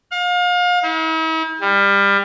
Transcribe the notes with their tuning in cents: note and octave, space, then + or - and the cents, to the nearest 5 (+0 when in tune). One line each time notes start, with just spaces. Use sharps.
F5 +35
E4 -45
G3 +25